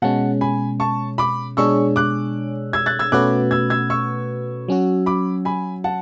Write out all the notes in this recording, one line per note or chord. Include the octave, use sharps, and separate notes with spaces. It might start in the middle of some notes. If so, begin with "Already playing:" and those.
B2 G#3 C#4 F#5 A5
G#5 B5
A5 C#6
B5 D6
B2 G#3 D4 G#4 C#5 C#6 E6
D6 F#6
E6 G#6
F#6 A6
E6 G#6
B2 A3 C#4 F#4 B4 D6 F#6
E6 G#6
E6 G#6
C#6 E6
F#3 C#4 F#4
B5 D6
G#5 B5
F#5 A5